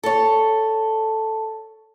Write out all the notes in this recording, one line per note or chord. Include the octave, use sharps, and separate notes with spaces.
A4 C#5